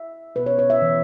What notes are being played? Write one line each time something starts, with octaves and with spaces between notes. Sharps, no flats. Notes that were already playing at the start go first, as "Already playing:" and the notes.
Already playing: E5
B2 B3 B4
C#5
C#5
E5
E3 B3